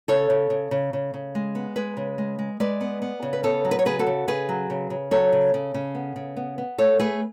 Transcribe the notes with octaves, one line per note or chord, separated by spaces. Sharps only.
C#3 A4 C#5
C#3
C#3
C#3
C#3
C#3
G#3
B3
G#3 G#4 B4
C#3
G#3
G#3
G#3 B4 D5
B3
B3
C#3
B4
B3 A4 C#5
F#3
B4
C#5
C#3 G#4 B4
F#4 A4
C#3
C#3 G#4 B4
F#3
C#3
C#3
F#3 A4 C#5
C#3
C#3
C#3
B3
C#3
B3
B3
A3 A4 C#5
A3 G#4 B4